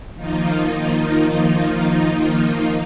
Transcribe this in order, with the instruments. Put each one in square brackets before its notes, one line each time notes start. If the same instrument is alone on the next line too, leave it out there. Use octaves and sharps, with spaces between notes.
[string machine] D#3 F3 A#3 D#4 F4